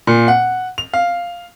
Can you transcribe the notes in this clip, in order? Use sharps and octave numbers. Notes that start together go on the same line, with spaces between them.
A#2
F#5
F7
F5